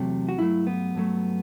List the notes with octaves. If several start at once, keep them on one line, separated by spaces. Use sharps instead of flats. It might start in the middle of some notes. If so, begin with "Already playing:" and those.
Already playing: E2 C3 F#3 A3 G4
F#4
G2 F#3 A3 E4
B3
G2 F#3 A3